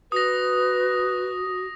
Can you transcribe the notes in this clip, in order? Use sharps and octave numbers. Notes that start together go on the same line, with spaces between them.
F#4 B4 D#6 A#6